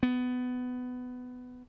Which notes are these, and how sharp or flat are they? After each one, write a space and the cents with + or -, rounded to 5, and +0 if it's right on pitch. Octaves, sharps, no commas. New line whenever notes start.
B3 +15